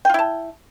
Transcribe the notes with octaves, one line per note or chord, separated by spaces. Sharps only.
E4 F4 G5 A5